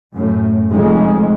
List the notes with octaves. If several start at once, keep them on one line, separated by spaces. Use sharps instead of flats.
F#2 A2
F1 F2 G#3